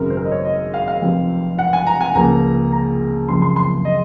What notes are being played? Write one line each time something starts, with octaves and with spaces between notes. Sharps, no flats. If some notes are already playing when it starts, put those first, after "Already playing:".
Already playing: G#1 F#2 C#3 F#3 A#4
C5
A#4
D#5
C#5
D#5
F5
F5
F1 F2 C3
F#5
G#5
A#5
G#5
C#2 C#3 F3 A#3 A#5
A#5
F#1 F2 C#3 F3 G#3 C6
C6
C6
D#5